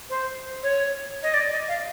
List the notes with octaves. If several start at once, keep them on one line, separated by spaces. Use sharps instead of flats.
C5
C#5
D#5
D5
D#5
F5